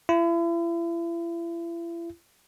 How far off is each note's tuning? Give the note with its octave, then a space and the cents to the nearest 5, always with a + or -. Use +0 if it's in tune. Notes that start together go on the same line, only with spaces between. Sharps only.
E4 +40